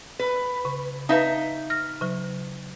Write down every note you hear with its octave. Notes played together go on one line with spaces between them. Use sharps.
B4
C#3
D#4 B4 E5 F5 D#6
F6 A#6
C#3 F#3